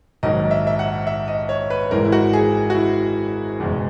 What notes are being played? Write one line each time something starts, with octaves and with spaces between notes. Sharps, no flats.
A#1 G#2 D#3 F#3 D#5
E5
E5
F#5
E5
D#5
C#5
B4
G#1 G#2 E3 G#3 A#4
E4
F#4
G#4
F#4
E4
F#1 E2 B2 G#3